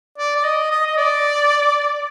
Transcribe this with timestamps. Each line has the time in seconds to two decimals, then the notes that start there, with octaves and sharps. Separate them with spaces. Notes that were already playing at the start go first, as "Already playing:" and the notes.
0.18 D5
0.36 D5
0.44 D#5
0.71 D#5
0.86 D#5
0.97 D5